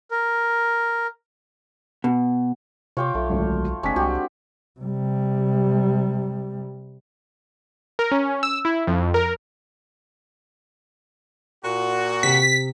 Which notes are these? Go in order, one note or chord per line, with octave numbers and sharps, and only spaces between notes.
A#4
B2
C3 F4 C#5 G5 D6
B1 A3
G#1 D2 F#3
F#1 G#3 C4 D4 C#6 B6
C2 F#4 G4
C3 G3
A#4
C#4
E6
E4
F2
A#4
A#2 F#4
C3 B6